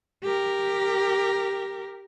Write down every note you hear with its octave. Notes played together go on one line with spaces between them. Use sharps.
G4 A#4